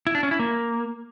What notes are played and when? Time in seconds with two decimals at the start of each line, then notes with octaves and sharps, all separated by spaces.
0.07 E4
0.15 D4
0.23 C#4
0.31 E4
0.39 A#3